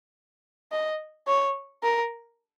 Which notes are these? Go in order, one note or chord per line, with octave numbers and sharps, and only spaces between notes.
D#5
C#5
A#4